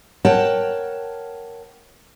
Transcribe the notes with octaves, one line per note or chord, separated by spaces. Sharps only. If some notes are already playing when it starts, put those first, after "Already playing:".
A#4 C#5 F#5 G5 A5